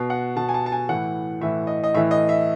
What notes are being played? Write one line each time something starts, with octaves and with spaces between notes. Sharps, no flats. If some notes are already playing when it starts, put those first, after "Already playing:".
Already playing: B2
F#5
B2 A5
G#5
A5
A5
G#5
A2 E3 F#5
A2 E3 E5
D#5
D#5
A2 E3 E5
D#5
E5